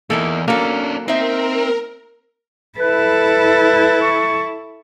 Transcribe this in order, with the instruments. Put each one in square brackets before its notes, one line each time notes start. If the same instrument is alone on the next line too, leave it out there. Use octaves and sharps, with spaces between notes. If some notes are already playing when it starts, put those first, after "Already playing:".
[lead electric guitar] E2 [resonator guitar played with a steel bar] A#3 D#4 E4 [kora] A4
[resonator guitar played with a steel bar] F#3 A4 [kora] A#3 [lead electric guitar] C#4 D4
[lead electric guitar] C4 [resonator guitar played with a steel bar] D#4 E5 [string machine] A#4
[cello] E4 A4 [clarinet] B4
[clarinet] C#6